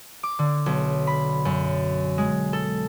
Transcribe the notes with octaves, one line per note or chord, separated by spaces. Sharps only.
D6
D3
B1
B5
F#2
G#3
A4